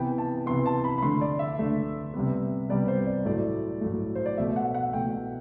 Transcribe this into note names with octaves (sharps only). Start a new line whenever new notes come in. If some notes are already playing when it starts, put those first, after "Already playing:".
Already playing: C3 E3 B3 G5
A5
C3 E3 B3 C6
A5
B5
B5
D3 A3 C6
D5
E5
D3 A3
C3 G3 B3
C3 G3 B3 D5
C5
D5
A2 F#3 A3 D5
A2 F#3 A3
C5
D5
B2 A3 E5
F#5
F#5
B2 A3 G5